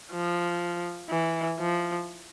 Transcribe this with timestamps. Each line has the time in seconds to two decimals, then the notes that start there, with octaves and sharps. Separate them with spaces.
0.12 F3
1.10 E3
1.59 F3